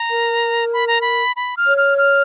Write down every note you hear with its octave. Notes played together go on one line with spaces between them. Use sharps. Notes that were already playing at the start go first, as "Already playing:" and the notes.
Already playing: A#5
A#4
B5
A#5
B5
B5
F6
C#5
F6
F6